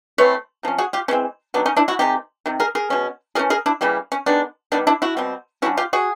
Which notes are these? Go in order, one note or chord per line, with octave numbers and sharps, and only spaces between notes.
E3 A3 C4 B4 C#5
C3 F3 C#4
F#4 G#4
F4 G4
E3 G#3 C4 C#4
D#3 F#3 B3 D4
C#4 D#4
D4 E4
E4 F#4
C3 D#3 G#3 G4
C3 D#3
G#4 A#4
G#4 A#4
B2 G#3 C#4
E3 A3 C#4 G#4 A#4
G#4 A#4
D4 E4
C#3 E3 G3 A#3
C#4
D#3 G#3 B3 D4
D#3 G3 B3 D4
D4 E4
E4 F#4
B2 G3 C4
D3 G3 A#3 C#4 E4 F#4
F4 G4
F#4 G#4